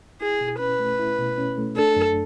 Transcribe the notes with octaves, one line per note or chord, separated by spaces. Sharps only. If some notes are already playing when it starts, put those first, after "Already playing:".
E4 G#4
B2
C#4 B4
A3
E4
B2
C#4
A3
D4 A4
F#2